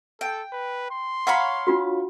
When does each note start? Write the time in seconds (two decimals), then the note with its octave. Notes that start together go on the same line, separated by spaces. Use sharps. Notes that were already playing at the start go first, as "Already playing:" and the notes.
0.21 A4 G5
0.53 B4
0.91 C6
1.27 C#5 F5 F#5 A#5 B5
1.67 D4 F4 F#4